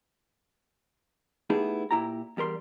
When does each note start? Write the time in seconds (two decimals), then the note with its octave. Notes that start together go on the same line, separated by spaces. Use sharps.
1.50 A3 B3 D#4 E4 G4 G#4
1.91 A#2 E4 G4 A#5
2.37 E2 G3 A#4 C6